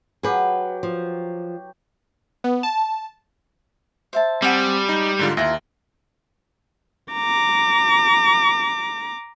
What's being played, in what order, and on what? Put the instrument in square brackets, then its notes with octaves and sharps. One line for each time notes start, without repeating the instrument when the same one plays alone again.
[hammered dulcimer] F#3 G4 [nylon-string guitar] G#4 B4
[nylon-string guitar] F3
[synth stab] B3
A5
[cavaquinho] C5 E5 A5
[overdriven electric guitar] G3 [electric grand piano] C4 [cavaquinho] F#5 G#5 A5
[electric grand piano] D#4
G#2 D3 F4
[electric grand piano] D#2 A#6 [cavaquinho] E4 F4 A#4
[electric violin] A#5 D6